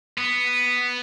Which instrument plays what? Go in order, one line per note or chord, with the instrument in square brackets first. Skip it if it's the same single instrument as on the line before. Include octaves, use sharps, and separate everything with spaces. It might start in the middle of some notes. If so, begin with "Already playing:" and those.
[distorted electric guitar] B3